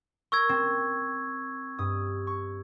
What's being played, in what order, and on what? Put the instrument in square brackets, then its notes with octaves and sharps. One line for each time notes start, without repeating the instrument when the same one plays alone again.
[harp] A#4 [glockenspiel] C#6 E6 G#6
[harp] C4
G2 D#6
C#6